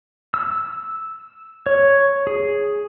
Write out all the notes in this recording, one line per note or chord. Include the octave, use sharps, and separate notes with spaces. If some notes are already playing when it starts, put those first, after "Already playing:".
E6
C#5
G#4